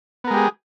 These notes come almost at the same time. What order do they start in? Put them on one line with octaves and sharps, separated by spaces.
B3 A#4 G#3 G4 G#4